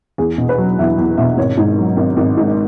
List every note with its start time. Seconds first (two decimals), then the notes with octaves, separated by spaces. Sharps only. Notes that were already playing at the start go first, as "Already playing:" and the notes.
0.18 E2 G#4
0.38 B2
0.49 B4
0.58 F#3
0.79 E2 E5
0.98 E2
1.17 B2 E5
1.37 G#1 C#5
1.57 G#2
1.78 F#3
1.97 G#1
2.17 G#1
2.37 G#2